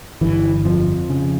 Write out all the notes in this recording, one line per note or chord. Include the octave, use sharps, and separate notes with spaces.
G1 E3
F2 F3
C#3